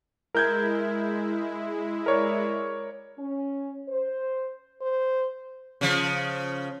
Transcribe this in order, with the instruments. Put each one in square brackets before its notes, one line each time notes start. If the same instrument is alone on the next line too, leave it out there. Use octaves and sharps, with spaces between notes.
[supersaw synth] G#3 E4 [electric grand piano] A#4 G6 G#6
[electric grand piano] A#4 C#5 D5
[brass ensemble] C#4
C5
[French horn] C5
[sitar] C#3 F3